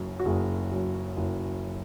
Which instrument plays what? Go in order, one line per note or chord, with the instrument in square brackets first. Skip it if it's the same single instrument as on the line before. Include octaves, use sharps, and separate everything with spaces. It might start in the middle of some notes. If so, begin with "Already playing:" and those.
Already playing: [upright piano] F#1 F#2
F#4
F#1 G#4
F#2
F#1